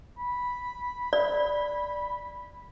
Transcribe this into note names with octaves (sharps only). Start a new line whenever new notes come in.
B5
D5